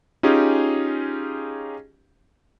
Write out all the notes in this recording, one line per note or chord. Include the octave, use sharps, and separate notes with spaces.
C#4 D#4 F4 G4 G#4